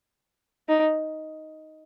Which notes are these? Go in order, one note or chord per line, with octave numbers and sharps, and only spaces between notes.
D#4